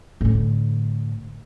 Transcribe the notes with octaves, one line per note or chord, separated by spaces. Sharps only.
A2 D3